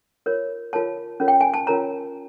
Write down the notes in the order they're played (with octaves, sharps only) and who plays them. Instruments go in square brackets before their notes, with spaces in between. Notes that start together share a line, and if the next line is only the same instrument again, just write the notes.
[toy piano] F4 A#4 C#5
F4 A#4 C#5 A5
C#4 F4 A#4 C#5
G5
G#5
A5
C#4 F4 A#4 C#5 A#5